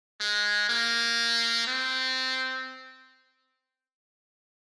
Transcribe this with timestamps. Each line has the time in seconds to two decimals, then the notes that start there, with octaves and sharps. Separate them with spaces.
0.21 G#3
0.69 A#3
1.67 C4